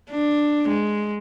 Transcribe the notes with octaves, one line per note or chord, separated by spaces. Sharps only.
D4
G#3